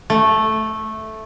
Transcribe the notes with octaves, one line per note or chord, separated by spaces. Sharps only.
A3